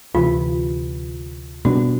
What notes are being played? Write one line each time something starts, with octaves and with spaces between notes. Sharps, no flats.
D2 C3 E3 F4
B2 G3 B3 D4 F#4